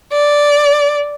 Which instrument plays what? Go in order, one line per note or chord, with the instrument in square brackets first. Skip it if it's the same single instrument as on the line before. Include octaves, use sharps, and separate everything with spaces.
[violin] D5